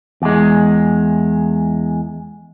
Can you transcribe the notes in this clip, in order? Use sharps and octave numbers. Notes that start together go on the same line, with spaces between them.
E2 G#3